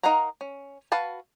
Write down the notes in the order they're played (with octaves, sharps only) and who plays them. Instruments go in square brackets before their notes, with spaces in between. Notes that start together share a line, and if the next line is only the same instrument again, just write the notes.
[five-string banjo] D#4 A#4 F5 F#5 A#5
C#4
F#4 B4 F5 A5